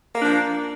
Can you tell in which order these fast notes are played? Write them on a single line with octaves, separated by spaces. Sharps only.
A#3 D4 F3